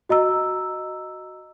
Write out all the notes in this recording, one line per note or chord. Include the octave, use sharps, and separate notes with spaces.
F#4 D#5 A#5 E6